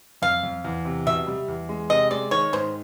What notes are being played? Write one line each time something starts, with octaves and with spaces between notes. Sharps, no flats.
F2 F5
F2
E2
C3
B2 E5
G3
E2
G#3
C3 D#5
G#3 D5
D#3 C#5
G#2 C5